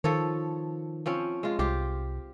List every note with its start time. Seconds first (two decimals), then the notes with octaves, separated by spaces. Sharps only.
0.04 D#3 F3 A4 C#5
1.06 F3 C4 C#4
1.43 G#3 F4
1.59 C2 F4 G4 C5